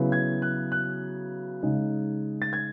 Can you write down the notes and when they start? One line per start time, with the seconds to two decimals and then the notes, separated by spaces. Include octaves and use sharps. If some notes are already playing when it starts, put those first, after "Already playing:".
Already playing: C#3 F#3 B3 E4
0.12 G#6
0.42 F#6
0.72 F#6
1.62 C#3 G#3 D#4
2.42 A6
2.53 G#6